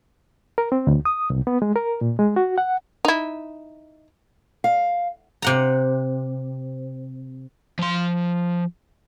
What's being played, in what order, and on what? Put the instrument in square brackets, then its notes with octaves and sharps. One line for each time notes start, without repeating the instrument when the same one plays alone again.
[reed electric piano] A#4
C4
D2
D#6
C2
B3
G#3
A#4
A#2
G#3
F#4
F#5
[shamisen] D#4 E4
[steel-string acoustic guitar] F5
[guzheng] C3 F#5 A#5
[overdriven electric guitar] F3 C6